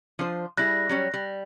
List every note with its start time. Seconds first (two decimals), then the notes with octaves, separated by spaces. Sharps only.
0.19 F3 D4 C5
0.57 G3 E4 G#4 F#6 A#6
0.89 F#3 G3 C#4
1.14 G3